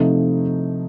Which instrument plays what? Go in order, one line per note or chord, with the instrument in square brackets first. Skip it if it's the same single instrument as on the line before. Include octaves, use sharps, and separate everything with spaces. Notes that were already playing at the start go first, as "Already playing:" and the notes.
Already playing: [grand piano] C3 F3 A3 C4 D#4